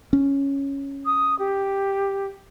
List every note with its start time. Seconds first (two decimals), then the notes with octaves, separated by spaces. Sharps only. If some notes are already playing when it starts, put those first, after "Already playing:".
0.13 C#4
1.05 D#6
1.38 G4